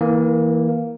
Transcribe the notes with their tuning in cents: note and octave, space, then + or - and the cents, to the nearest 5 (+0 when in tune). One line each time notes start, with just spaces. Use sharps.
E3 -20 A#3 +0